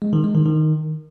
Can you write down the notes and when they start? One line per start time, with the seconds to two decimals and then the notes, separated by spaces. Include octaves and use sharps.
0.02 G#3
0.13 D#3
0.24 G#3
0.35 D#3
0.46 D#3